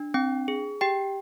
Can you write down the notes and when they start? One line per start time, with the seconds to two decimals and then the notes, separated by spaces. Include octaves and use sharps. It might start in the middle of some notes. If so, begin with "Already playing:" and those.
Already playing: D4
0.14 C4 G5
0.48 G#4
0.81 G4 G5